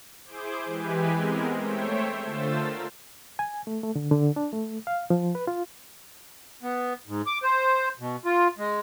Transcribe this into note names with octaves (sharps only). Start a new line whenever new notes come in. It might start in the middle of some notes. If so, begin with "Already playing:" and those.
E4 G#4 C5 D6 G6
E3 G#3 G4 B4 G#5
G#3 B3 C4 A#4
A3 C5 C#5 E5 G5
D3 A3 F4 C5 E6 A6
A#4 F5
G#5
A3
A3
D3
D3
D4
A3
F5
F3
B4
F4
B3
G#2
D6
C5
B2
F4
G#3